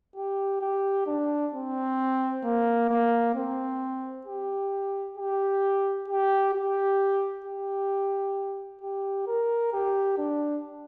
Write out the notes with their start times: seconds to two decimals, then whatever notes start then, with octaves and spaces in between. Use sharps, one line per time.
0.16 G4
0.62 G4
1.07 D4
1.53 C4
2.44 A#3
2.90 A#3
3.35 C4
4.27 G4
5.17 G4
6.08 G4
6.53 G4
7.44 G4
8.81 G4
9.27 A#4
9.73 G4
10.18 D4